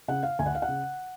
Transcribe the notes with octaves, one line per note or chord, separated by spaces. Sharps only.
C#3 F#5
F5
D2 G#5
F#5
F5
F#5
C#3